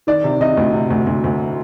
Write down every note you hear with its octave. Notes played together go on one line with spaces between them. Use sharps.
D#3 D5
C3
C3 D#5
D2
C3
D2
D2
D2